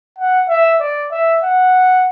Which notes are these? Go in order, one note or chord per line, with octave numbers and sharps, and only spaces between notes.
F#5
E5
D5
E5
F#5